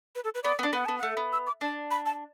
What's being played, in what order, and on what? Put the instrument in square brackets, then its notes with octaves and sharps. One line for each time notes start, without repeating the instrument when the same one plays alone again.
[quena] B4
A4
B4
[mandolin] B3 [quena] D5
[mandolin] B3
D4
[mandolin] B3 [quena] F#5
[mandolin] B3 [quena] A5
[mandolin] A3 [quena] F#5
[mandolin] B3
[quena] E6
D6
[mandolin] D4 [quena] A5
[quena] B5
A5